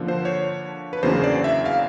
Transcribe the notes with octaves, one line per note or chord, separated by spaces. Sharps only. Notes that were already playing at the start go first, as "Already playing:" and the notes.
Already playing: D3 F3 A#3 D4
C5
C#5
B4
E2 C#3 F#3 A#3 D4 C5
D5
E5
F5